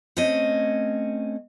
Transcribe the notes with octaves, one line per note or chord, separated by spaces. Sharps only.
A3 C4 C#4 C#5 D#5